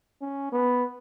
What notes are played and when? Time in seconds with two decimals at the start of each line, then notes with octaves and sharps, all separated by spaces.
0.22 C#4
0.52 B3